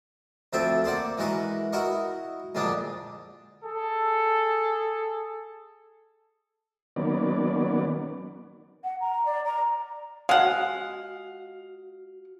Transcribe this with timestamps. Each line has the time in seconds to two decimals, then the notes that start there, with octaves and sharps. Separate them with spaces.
0.53 D2 F3 C4 A4 E5 G5
0.84 A#3 C5 D5 F#5
1.18 E3 G#3 F#4 A#4 B4
1.73 E4 F#4 A#4 D#5 C#6
2.55 F2 A#2 D3 G#3 D4 D#6
3.64 G#4 A4
6.96 D#3 F#3 A#3 B3 C#4 D5
8.83 F#5
9.00 A#5
9.25 D5
9.45 A#5
10.29 G#3 F#4 F5 F#5